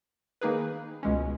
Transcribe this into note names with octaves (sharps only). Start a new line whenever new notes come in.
D#3 A#3 D#4 G#4 B4
C#2 B2 G#3 C#4